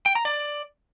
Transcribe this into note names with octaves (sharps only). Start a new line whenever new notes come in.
G5
A#5
D5